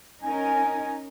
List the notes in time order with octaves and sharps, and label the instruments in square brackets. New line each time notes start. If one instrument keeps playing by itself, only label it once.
[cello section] C#4 D#4 A#4 [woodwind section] G#5